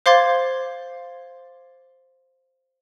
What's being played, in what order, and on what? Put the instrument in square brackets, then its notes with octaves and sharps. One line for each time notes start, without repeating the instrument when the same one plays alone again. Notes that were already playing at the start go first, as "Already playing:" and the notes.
[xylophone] C5 F5 C6 D6 G#6 A6